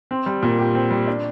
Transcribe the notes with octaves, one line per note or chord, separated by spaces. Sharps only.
C4
G3
A#2
G4
C4
G3
D4